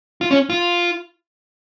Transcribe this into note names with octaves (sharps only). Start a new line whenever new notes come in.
F4
C#4
F4